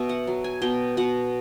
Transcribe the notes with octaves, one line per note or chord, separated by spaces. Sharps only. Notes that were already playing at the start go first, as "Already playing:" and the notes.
Already playing: B2 E5
F#5
F#3
G#5
B2 G5
B2 F#5